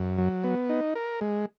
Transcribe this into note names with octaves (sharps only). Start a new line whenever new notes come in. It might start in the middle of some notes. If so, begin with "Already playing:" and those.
Already playing: F#2
F#3
B3
D#4
A#4
G#3